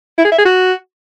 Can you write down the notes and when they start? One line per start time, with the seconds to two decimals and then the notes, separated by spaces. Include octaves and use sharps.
0.18 E4
0.25 G#4
0.31 E5
0.38 G#4
0.45 F#4